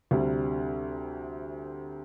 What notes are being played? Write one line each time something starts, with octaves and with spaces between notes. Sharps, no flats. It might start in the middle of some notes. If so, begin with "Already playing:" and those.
D2 C3 G3